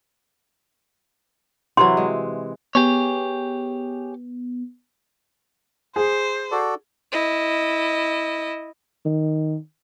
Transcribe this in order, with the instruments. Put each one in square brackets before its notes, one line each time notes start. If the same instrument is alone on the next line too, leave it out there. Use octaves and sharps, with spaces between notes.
[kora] C3 E3 F#3 [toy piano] C6
[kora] G#3
[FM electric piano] B3 [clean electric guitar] G4 G#4 C#5
[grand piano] G#4 [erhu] C5
[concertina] F#4 A4 D5
[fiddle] E4 D#5
[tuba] D#3